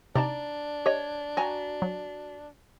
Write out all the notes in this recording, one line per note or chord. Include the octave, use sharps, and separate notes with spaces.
C3 D4 D#4 D5 A5 A#5
G4 C#5 D#5
F#4 G#5 A#5
F#3